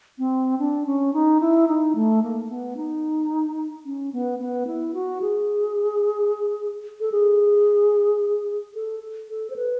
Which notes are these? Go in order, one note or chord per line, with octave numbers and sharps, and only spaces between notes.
C4
D4
C#4
D#4
E4
D#4
A3
A#3
B3
D#4
C#4
B3
B3
E4
F#4
G#4
A4
G#4
A4
A4
C5
B4